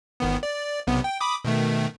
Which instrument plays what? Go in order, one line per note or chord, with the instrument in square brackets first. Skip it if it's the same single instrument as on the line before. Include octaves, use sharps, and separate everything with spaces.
[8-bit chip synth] G1 D#3 B3
D5
B1 C3 B3
G5
B5 D6 D#6
B2 D#3 A3